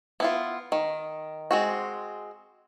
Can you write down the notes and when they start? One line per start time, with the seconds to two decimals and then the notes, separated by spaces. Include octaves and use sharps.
0.20 B3 E4 F4
0.72 D#3
1.51 G#3 C4 F#4